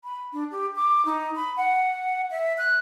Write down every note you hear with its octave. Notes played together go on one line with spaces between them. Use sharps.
B5
D4
G4
D6
D#4
B5
F#5
E5
F#6